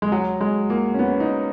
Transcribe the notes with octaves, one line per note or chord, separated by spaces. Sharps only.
G#3
F#3
G#3
A#3
C#4
B3
D#4